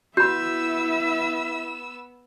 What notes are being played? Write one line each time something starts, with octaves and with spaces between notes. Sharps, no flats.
B3 E4 F#4 E5 B5 E6 G6